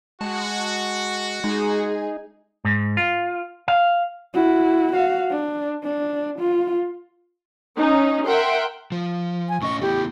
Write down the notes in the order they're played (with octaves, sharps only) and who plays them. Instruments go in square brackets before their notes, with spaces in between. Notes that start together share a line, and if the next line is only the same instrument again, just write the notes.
[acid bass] G#3 [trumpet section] F#4 [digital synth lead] A5
[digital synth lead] G#3 [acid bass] D#4 [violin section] G#4
[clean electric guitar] G#2
F4
F5
[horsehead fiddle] E4 F#4
F#4 F5
D4
D4
F4
[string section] C#4 D#4
A#4 E5 F#5 G5 C6
[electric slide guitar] F3
[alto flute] G#5
[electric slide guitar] A2 C#4 D#5 [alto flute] C#6
[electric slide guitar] A3 B3 E4 [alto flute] G4